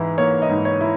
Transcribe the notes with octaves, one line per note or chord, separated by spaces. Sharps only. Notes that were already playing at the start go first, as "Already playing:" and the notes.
Already playing: G#2 E3 E4
A#3 C#5
D#5
G#2
C#5
E4